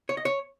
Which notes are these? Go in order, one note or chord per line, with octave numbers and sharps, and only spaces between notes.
C#5
D#5
C#5